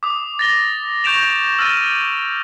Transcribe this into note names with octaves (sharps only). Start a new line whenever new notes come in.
D6 D#6
A6 A#6 G7
C#6 G6 A#6 D7 E7 F7
E6 F6 A6 D#7 E7